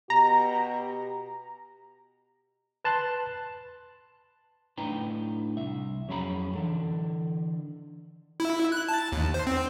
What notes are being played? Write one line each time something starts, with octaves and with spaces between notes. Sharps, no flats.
B2 G4 A#5
B4 A5 C6 F#6
A2 D4 D#4 B4 G5 A#5
C2 E5
F2 F#3 C#4 G#4 A#5 B5
D3 E3 A4
E4
F#6
A5
D#2
C5
C4